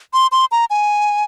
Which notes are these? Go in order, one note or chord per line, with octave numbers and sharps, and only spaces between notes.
C6
C6
A#5
G#5